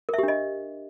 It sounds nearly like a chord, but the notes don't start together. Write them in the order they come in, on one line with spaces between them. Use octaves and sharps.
A#4 E5 G4 D4 D#5